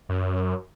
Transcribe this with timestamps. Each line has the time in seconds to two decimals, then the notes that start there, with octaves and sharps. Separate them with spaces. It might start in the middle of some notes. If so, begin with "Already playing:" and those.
0.09 F#2